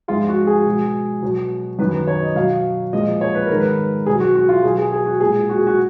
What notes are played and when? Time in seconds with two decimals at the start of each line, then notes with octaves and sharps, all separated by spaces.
0.08 G#2 F3 G#3 F4
0.28 F#4
0.47 G#4
0.66 B2 G#3
1.22 B2 F#3
1.79 F#2 D#3 F#3 B4
1.93 B4
2.07 C#5
2.22 D#5
2.35 B2 F#3 F5
2.93 A#2 F3 G#3 D#5
3.21 C#5
3.35 B4
3.47 G#2 D#3 G#3 A#4
3.60 B4
4.06 B2 F#3 G#4
4.20 F#4
4.35 F#4
4.49 F4
4.63 B2 F#3 G#4
4.78 G#4
4.92 G#4
5.06 F#4
5.20 A#2 G#4
5.25 G#3
5.49 F#4
5.58 G#4
5.67 F#4